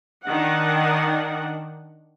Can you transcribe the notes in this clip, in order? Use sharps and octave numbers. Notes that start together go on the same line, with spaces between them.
D#3 D4 F#5